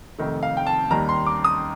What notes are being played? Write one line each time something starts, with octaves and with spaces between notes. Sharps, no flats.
F1 F2 D#3 A3
F5
G5
A5
D#2 D#3 G3 A#5
C6
D6
D#6